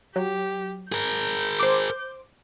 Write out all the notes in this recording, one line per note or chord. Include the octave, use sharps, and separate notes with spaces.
F#3 G4
G#4 A#4 G6
C5 D6